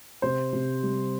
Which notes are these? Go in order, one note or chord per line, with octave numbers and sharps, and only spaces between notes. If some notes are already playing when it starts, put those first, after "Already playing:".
C3 C5
C3
G3